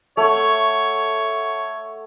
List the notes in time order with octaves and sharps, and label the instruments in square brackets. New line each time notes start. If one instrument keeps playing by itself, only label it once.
[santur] A3 F#5 [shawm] C#5